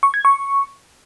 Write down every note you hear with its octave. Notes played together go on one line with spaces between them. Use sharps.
C#6
G#6
C#6